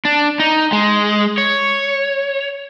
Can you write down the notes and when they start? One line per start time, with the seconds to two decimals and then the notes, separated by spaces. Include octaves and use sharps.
0.05 D4
0.40 D#4
0.72 G#3
1.38 C#5